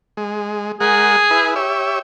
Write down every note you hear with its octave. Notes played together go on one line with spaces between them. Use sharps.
G#3
G#3 G#4 A#4 F#5
E4 B4
G4 C#5 E5